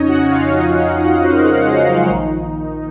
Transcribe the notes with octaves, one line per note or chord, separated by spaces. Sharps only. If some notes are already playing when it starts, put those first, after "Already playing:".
Already playing: F2 C#3 F3 C#4 D#4 C#5 D#5
F#4 F#5
F4 F5
D#4 D#5
C#4 C#5
C5
A#4
G#3 G#4
G#3 G#4
F#3 F#4
A#1 A#2 D#3 F3 D#4